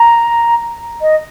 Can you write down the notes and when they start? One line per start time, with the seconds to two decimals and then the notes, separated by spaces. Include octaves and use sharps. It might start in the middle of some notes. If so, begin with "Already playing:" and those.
Already playing: A#5
1.02 D#5